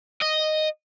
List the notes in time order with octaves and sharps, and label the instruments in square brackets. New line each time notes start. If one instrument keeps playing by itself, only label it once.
[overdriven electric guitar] D#5